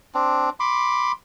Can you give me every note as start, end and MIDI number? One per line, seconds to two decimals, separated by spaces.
0.14 0.50 60
0.14 0.50 62
0.60 1.12 83
0.60 1.12 84
0.60 1.12 86